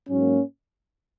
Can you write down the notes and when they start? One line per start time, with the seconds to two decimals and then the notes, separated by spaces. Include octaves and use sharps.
0.08 G#2 F#3 A#3 C#4